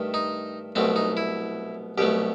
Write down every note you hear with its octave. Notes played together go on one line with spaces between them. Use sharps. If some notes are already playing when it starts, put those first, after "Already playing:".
Already playing: G2 D#3 A3
D#4
C2 B2 F#3 A3 C4
D#4
E4
C2 B2 F#3 A3 G4